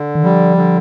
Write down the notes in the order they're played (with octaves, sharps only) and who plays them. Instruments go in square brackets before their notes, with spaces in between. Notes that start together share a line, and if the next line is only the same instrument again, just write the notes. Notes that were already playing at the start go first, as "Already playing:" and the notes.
Already playing: [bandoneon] D3
[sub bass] D#3
[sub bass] F3 [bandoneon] G3
[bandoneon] D3